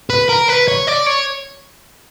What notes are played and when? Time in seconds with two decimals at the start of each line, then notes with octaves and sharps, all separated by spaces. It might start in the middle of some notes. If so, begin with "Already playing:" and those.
0.10 B4
0.29 A#4
0.48 B4
0.68 C#5
0.87 D5
1.06 C#5